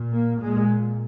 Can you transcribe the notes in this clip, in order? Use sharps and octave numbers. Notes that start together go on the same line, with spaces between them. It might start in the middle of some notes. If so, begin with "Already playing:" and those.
Already playing: A#2
A#3
A#2 G#3